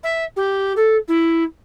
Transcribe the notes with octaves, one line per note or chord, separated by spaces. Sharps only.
E5
G4
A4
E4